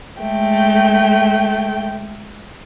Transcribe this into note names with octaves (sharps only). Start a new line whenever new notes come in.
G#3 A3 G5